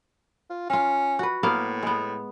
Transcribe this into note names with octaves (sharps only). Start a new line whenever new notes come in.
F4
C#4 F4 F5
F#4 B4
A2 A#3 B3 F5
G#3 B3